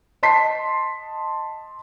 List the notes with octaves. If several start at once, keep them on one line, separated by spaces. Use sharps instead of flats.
D#5 A5 C6 B6 C7